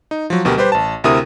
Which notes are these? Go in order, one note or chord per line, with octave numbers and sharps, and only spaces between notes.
D#4
F3 F#3
D2 B2 F#4 G4 A#4
G3 G4 B4 C5
A1 A5
D2 C3 E4 A#4 D#6 D#7